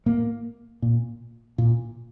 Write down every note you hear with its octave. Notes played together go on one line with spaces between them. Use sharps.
A2 A#3
A#2
A#2